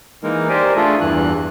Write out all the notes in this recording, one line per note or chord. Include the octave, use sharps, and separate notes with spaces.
E3 G#3 A#3 D#4 A#4
G4 A#4 C5 D5 G#5
A3 D4 F4 G#4 A4
E2 G2 E3 F#6